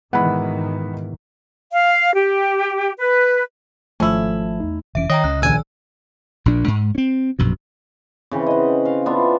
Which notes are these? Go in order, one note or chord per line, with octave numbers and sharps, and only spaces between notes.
G#2 B2 D#3 E3 G#3 B3 F#5 B5
F5
G4
B4
G#1 F3 A3 C#4 E4 A5
E2 D#4
F1 E3 C#4 E5 D7
D#3 C#5 D#5 G5 A#5
C#2 C#3 C#4 F#6
A#1 D#3 G#5 E6
A#1 A#2 D4
G#2
C4 C#4
A#1 F#2 B2
C#3 E3 C4
D#5 F#5
F5
B3 D4 F4 E5